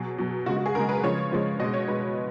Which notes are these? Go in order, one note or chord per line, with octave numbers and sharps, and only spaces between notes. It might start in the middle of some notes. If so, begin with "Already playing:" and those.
Already playing: B2 F#3 G#4
B2 F#3
C#3 G#3 F#4
F#4
G#4
C#3 G#3 A#4
B4
C#3 F3 G#3 C#5
C#3 F3 G#3
B2 G#3 D#5
C#5
B2 G#3 B4